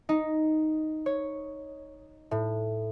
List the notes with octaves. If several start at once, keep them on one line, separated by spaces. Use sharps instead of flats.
D#4
C#5
A2